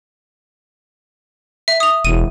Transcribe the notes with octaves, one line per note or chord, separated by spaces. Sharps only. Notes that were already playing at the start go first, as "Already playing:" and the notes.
E5
D#6 F7
E1 D#7